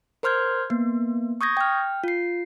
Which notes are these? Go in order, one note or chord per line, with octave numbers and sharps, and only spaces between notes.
A#4 C5 C6 F6 G6 G#6
A#3 B3
C#6 D#6 G6 G#6 A#6
G5 F6
F4 C7